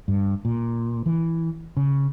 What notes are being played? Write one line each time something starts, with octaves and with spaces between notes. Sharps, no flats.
G2
A#2
E3
C#3